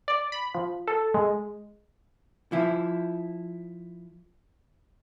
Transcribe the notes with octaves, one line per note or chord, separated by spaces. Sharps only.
D5
B5
F3
A4
G#3
F3 E4